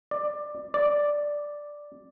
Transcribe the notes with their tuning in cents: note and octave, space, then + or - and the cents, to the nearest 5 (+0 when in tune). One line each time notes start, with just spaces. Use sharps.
D5 +15
D5 +0